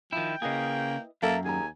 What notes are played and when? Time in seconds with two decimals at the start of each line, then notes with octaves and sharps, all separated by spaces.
0.13 D#3 F3 E4 G5
0.42 C#3 A#3 E4 G#4 B4 D#5
1.23 F#2 A#3 A4 E5 A5 A#5
1.45 D#2 G#4 G#5 A#5